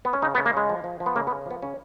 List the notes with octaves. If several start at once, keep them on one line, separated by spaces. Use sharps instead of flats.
B3
C#4
C#3 D#4
B3
C#3
A#3
C#3 G#3
F3
F3
F3
B3
C#3 A#3
B3
C#3
F3 B3
C#3 C#4